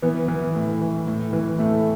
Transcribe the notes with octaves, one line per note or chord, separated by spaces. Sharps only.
E3 B3
E3
A2
E3
A2
E3
A2 A3